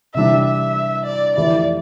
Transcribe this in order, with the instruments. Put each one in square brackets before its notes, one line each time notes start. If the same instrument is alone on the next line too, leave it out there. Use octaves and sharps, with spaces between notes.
[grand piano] C3 E3 G3 D4 [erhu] E5
[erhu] E5
D5
[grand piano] F2 E3 A3 E4 G4 [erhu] D5